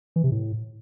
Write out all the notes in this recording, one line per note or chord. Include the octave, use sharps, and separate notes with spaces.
E3
C3
A2